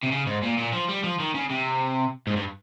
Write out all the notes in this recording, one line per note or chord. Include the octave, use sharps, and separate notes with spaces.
C3
C#3
G#2
A#2
A#2
F3
G3
F3
D#3
C#3
C3
G#2
G2